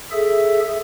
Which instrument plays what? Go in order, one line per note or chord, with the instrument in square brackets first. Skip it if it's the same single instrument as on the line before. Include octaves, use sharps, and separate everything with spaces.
[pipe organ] G#4 A4 E5